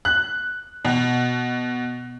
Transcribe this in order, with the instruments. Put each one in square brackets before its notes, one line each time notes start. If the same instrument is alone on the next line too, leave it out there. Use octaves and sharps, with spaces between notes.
[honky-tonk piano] F#6
B2